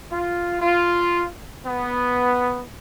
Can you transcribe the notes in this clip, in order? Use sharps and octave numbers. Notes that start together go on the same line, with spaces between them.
F4
F4
B3